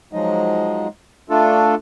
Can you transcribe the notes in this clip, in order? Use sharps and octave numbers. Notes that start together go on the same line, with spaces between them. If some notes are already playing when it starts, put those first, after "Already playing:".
F3 F#3 G#3 D#4 D#5
A3 D4 F4 A4